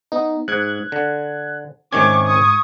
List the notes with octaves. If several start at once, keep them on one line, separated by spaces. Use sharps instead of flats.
B3 D#4
G#2 F#6 G#6
D3
G#2 C3 D#3 C#4 C#6 D6 G#6
C#6 D#6